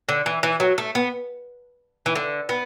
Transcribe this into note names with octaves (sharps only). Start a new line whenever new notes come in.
D3
E3
E3
F#3
A3
B3
E3
D3
B3